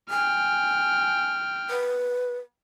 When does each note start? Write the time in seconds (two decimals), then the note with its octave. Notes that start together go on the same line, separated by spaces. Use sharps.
0.10 G5 G#5 F6
1.70 B4